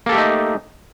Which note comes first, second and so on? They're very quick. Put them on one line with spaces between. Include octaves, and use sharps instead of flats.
A#3 A4 G4 A3 D#4